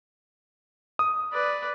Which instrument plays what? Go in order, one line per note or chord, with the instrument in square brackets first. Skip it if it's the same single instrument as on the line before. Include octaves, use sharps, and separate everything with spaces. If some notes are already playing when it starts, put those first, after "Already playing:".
[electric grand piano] D#6
[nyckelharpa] B4 D5